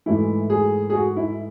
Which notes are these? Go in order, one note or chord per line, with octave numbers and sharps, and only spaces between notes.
G#2 E3 A3 E4
G#4
G#4
F#4
E4